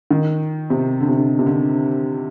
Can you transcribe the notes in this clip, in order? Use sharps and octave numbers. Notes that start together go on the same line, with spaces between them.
D#3
C3
D3
C3
D3
C3
D3